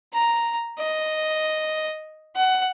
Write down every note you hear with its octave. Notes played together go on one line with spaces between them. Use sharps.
A#5
D#5
F#5